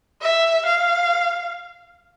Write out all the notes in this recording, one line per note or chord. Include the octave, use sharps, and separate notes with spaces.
E5
F5